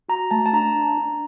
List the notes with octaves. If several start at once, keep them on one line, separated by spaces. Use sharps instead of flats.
F#4 A#5
A3 A5
A5
D4 A#5
D4
D4